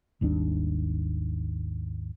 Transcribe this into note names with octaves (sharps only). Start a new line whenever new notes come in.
G#1 D#2 G3 D4